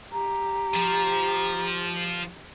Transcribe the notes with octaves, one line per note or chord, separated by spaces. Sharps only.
G4 A#5
F3